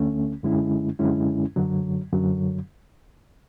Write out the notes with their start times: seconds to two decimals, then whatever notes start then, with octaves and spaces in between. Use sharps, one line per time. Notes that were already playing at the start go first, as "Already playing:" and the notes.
Already playing: D2 D3 A3 C#4
0.43 F#2 D3 G#3 C#4 E4
0.99 F#2 D3 G#3 C#4 E4
1.56 F#2 D3 F#3
2.13 F#2 D3 F#3